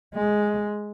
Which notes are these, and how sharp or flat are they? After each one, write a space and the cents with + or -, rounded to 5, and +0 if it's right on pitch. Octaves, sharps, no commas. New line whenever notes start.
G#3 +5